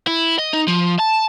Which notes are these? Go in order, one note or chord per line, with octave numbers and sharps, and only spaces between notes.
E4
D#5
D#4
F3
A5